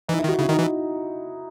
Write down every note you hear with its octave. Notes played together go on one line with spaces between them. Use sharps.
E3 D#4
E4
D#3 F#4
C#3 E4
D#3 D#4
E3